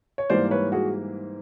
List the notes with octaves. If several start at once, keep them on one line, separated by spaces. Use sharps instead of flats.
C#5
G#2 E3 G3 A#3 C5 D5
B4 C#5
F#4 G#4